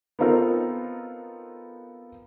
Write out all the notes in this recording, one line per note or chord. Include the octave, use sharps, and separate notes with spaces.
B3 C4 D#4 F4 A4 A#4